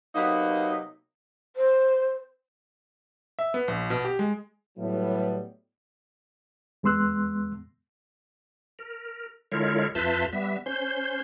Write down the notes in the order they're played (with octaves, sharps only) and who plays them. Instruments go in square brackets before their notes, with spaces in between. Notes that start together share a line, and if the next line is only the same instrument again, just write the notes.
[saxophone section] C3 F#3 A#3 B3 D#4
[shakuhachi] C5
[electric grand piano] E5
B3
A#1
B2
G4
G#3
[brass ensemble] A2 F#3 G3 B3
[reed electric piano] E2 G#3 B3 C6 E6 F#6
[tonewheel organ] A#4
D3 G#3 E4 F4 A#4 C#5
F2 F4 B4 E5 A5 G6
G3 B3 E5
C#4 C5 G6